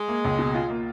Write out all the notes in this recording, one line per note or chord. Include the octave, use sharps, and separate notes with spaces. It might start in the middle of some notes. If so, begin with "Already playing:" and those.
Already playing: G#3
A#3
C#2
B2
F4
A#3